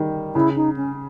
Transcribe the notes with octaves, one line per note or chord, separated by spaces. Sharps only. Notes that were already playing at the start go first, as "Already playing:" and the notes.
Already playing: D#3 G3
C#3 E4
D#4
C#4